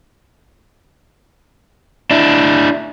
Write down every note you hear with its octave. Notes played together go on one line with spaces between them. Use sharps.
D4 E4